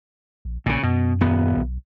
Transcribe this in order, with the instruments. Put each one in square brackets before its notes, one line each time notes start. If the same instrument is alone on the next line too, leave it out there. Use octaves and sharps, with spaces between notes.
[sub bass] A#1
[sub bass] A#1 [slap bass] A#2 C#3
[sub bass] F#2 [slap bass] B2
[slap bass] D#1 B3
[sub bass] B1